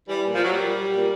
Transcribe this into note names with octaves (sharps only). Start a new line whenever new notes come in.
E3 G3
A#2
F3
F#3
G3
A#2
A#2